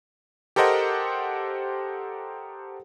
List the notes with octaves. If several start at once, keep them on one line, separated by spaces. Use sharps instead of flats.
G4 A4 A#4 C5 D#5 F#5